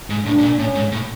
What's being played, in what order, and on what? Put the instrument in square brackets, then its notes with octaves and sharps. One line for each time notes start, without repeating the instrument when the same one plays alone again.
[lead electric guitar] G#2
[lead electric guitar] A2 [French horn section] D4
[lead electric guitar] A2
A#2
[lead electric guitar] A2 [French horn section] C#4
[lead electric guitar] G#2
A2